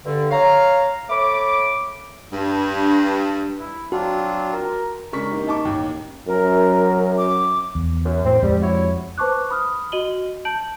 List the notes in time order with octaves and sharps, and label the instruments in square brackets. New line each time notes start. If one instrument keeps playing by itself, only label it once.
[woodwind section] G2 D3
C#5 F5 A#5
A3 C#5 B5 D6
[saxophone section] G2
[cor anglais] E4
[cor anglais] F#3 [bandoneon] C4 D4 F4 [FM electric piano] F#4
[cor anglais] A#4
[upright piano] C#3 G#3 D4 A#4 C#6 B6
A#3 D#4 G4
D#4 D#5 A5 C#6 D6
A1 D#2
[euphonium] F#2 [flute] A#4
[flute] D6
[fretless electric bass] E2
[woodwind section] F#2
[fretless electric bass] A2 [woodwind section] C4
[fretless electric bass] F2 G#3 C4 [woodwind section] G3
[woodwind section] E4 F#4 C#5
[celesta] B4 C5 A5 C#6 D6 F#6
B5 D#6 F6
F#4 D#5 D#7 F#7 G7
A5 G6 D7 F#7